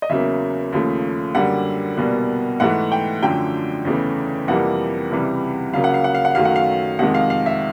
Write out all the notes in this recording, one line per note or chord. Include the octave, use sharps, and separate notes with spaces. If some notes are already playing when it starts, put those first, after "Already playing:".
D#5
E2 C#3 F#3 A#3 E5
D#2 C#3 F3 A3
F#2 D3 G3 A#3 F#5
C2 B2 G3 A#3
G#2 E3 A3 F#5
G5
F#2 D3 F3 A3 G5
E2 C#3 E3 A3
F2 C3 E3 G3 A#3 F#5
C#2 C3 E3 G3
C#2 C#3 F#3 A#3 F5
F#5
F5
F#5
F5
F#5
F#2 D#3 F#3 A3 F5
F#5
F5
F2 C3 D#3 G#3 F#5
F5
F5
E5